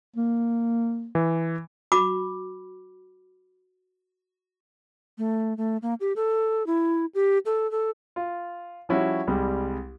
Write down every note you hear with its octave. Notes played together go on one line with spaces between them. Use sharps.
A#3
E3
F#4 B5 D6
A3
A3
A#3
G4
A4
E4
G4
A4
A4
F4
F3 G3 C#4 E4 F#4
C2 G3 G#3